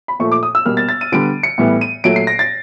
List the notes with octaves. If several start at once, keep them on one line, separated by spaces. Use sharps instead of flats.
B5
A#2 F3 A3 C#6
D6
D#6
E6
B2 G3 A#3 F6
A6
A6
D#7
D3 G3 B3 D7
C#7
A2 E3 G3 B3
D#7
A#2 F#3 A3 D7
C7
A#6
A6